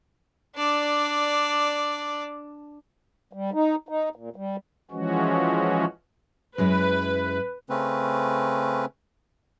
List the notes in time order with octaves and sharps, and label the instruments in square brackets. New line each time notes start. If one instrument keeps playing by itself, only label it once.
[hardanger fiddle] D4 D5
[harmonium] G3
D#4
D#4
A#2
G3
[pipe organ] E3 F3 G#3 C#4 F#4
[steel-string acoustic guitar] F#2 G#3 E4 [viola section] B4
[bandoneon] C#3 A3 C4 C#4 B4